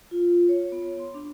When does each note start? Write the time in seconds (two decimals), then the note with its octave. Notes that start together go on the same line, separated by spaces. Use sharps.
0.11 F4
0.49 C#5
0.72 B3
0.99 C6
1.14 D4